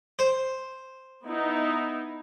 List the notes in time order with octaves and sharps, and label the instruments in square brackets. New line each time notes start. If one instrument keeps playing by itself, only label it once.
[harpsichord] C5
[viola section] B3 D#4 E4